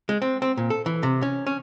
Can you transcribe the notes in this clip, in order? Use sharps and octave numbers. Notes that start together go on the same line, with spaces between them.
G#3
C4
C4
A#2
A4
E3
C3
C#4
C#4